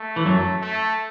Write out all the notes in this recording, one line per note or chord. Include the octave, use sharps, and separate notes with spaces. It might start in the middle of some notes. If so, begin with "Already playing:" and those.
Already playing: A3
E3
F#2 F#3
A3